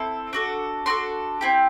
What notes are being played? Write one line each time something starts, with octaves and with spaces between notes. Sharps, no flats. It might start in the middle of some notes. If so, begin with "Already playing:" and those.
Already playing: C4 E4 A4
D4 F#4 A4
D4 F#4 A4 C6
C4 E4 G4